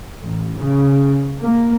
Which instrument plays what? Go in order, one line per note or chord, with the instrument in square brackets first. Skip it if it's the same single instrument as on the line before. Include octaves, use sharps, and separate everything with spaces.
[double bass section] A1
C#3
A#3